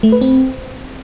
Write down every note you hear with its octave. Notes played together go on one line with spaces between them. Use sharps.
A3
B4
C4